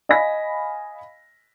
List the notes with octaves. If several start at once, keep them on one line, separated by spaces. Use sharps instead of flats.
D#5 F5 G#5 B5 A#6 B6